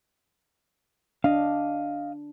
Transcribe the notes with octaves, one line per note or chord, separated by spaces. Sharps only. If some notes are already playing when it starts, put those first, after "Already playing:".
D4 D#5 F5